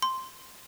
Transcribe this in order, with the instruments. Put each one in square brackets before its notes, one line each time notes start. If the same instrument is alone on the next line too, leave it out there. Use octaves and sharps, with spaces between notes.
[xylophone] C6